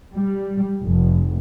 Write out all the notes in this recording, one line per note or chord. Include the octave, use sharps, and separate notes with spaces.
G3
F1